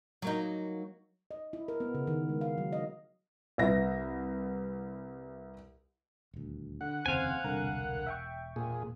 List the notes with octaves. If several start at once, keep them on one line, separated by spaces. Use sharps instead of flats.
F#3 A#3 D#4
D#5
E4
A#4
B3
C#3
D#3
G#3
F5
F#3
D#5
C2 B4 E5 A#6
D#1 D2
D3 F#5
F1 D#2 C#3 C4 C5 F5 G#5
E1 C2 D3 A#4
E5 G5 C#6
A#2 G#4